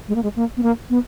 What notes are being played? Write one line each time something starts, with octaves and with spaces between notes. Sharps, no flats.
G#3
A#3
G#3
A#3
B3
A#3
B3